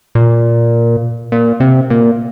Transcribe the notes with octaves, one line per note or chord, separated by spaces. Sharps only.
A#2
A#2
C3
A#2